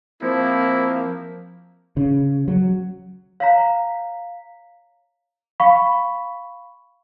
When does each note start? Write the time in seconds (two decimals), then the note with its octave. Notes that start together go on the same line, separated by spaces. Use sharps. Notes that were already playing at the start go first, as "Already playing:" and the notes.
0.22 F3 A#3 C4 E4
1.97 C#3
2.48 F#3
3.40 C#5 F5 A#5 B6
5.60 F5 B5 C#6 B6